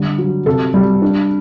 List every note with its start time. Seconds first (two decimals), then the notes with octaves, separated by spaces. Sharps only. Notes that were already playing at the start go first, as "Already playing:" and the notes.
Already playing: D3 G3
0.18 F#3
0.46 C3 A4
0.74 G3
1.02 D4